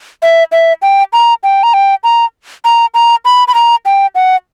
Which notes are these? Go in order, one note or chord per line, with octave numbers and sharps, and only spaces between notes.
E5
E5
G5
A#5
G5
A#5
G5
A#5
A#5
A#5
B5
B5
A#5
G5
F#5